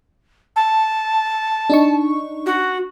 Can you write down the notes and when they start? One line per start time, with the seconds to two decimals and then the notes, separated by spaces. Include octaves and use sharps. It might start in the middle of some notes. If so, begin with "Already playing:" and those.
0.56 A5
1.70 D4 D#4 C#6
2.46 F#4